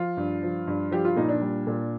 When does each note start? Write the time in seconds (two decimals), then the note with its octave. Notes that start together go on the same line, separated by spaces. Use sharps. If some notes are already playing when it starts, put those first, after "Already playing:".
Already playing: F3 F4
0.17 G2
0.43 F3
0.67 G2
0.91 F3 G4
1.05 F4
1.16 A#2 D#4
1.29 D4
1.41 G3
1.67 A#2